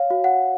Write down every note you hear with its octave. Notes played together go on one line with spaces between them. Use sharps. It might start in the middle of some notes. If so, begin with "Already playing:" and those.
Already playing: C#5 F5
F#4
F#5